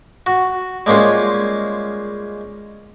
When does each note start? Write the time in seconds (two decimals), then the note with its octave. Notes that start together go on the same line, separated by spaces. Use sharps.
0.26 F#4
0.86 G3 G#3 A#3 C#4 F4